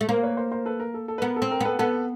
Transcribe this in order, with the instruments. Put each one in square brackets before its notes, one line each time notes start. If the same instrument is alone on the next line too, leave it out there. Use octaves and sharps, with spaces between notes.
[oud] A3
[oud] A#3 [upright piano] A#4 C5
[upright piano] B4 C#5
A#4 C5
A#4 C5
A4 B4
A#4
A4
A4
B4
[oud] B3 [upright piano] A#4
[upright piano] A4
[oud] C4
[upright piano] A#4
[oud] B3 [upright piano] A4 B4
[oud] B3 [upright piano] A4 B4